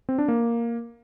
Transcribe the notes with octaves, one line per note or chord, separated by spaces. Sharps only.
C4
D4
A#3